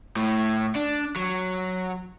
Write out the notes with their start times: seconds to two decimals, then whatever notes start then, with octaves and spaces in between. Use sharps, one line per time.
0.16 A2
0.76 D4
1.16 F#3